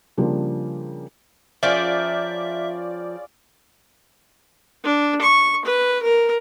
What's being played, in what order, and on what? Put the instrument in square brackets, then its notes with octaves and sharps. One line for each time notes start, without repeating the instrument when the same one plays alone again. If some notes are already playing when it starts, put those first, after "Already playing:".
[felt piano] C#3 F3 G3 A#3 D4
[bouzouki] F3 A#4 G5 [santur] C#4 F4 G#4 [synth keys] D5 [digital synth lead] E5
[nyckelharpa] D4
C#6
B4
A#4